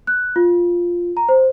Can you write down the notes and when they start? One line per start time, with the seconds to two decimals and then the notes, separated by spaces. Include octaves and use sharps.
0.07 F#6
0.36 F4
1.17 A#5
1.29 C5